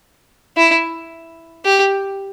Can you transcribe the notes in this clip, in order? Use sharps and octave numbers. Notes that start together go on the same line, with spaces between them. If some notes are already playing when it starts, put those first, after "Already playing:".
E4
G4